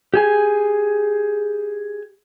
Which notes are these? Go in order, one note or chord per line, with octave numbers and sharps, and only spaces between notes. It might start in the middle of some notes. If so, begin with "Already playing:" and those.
G4 G#4 G#5